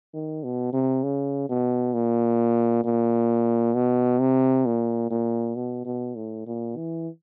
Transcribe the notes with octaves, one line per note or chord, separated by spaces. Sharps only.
D#3
B2
C3
C#3
B2
A#2
A#2
B2
C3
A#2
A#2
B2
B2
A2
A#2
E3